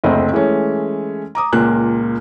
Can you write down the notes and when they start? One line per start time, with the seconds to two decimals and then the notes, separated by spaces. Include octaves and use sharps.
0.04 F#1 D2 A3 C4 D#5
0.33 E3 G#3 A3 C#4
1.35 A#5 D6 D#6
1.53 C#2 A#2 A#3 F#6